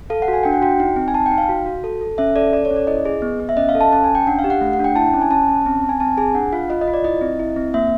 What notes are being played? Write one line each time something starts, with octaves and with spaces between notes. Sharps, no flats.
A4 F5
F#5
F#4
G#5
D4 G5
F#5
F#4 G5
D#4
C4
G#5
D#4 A5
G5
D#4
F5
F#4
F#4
A4
A4
C#4 E5
A4 D5
A4 D5
C#5
C#4
D5
E4 D#5
G#4
B3
B3
E5
C#4 D#5
F5
A4
A5
C#4 A5
G#5
C#4
G5
D4 F#5
F5
G4
F#5
A3
F#5
D4
G5
E4 A5
C#4
G#5
C#4 A5
C#4
C4
C4
G#5
C4 A5
G#4 G#5
D4 F#5
F4 F5
F4 D#5
D#5
F4
D5
E4 D#5
C4
E4
C4
A#3 E5